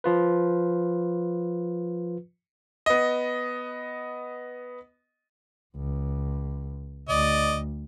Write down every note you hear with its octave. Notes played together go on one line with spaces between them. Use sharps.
F3 F4 B4
B3 D#5
C#2
D2 D5 D#5